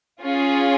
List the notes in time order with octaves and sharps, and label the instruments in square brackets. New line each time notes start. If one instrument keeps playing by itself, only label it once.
[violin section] C#4 F4 G#4